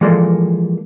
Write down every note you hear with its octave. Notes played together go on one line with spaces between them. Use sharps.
E3 F3 G#3 A#3 A4 D5